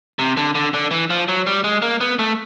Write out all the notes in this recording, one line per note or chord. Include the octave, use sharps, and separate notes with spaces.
C3
D3
D3
D3
E3
F3
F#3
G3
G#3
A#3
B3
A3